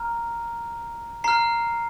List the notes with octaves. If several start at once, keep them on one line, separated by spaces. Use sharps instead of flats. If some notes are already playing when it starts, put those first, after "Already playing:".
Already playing: A#5 F6
A#5 F6 C7